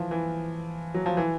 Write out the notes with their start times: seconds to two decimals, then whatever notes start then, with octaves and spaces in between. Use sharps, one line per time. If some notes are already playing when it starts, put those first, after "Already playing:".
Already playing: E3 F3
0.11 E3
0.94 F#3
1.06 F3
1.17 E3